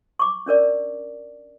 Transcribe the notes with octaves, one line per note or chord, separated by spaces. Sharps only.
C#6 D6
C#4 D4 A#4 D5